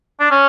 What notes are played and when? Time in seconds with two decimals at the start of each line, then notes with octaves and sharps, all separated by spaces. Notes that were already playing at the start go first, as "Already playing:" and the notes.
0.20 D4
0.31 C#4